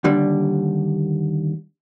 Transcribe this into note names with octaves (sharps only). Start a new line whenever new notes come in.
D#2 D3 G3 D4